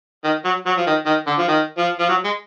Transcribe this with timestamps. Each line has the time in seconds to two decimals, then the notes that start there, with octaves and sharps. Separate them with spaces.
0.25 D#3
0.45 F#3
0.66 F#3
0.78 F3
0.87 D#3
1.06 D#3
1.27 D3
1.38 F3
1.48 D#3
1.78 F3
1.99 F3
2.09 F#3
2.25 G#3